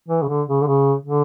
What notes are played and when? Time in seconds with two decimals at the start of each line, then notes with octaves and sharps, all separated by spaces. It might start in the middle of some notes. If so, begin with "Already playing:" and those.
0.08 E3
0.22 C#3
0.28 D3
0.48 C#3
0.62 D3
0.67 C#3
1.05 D3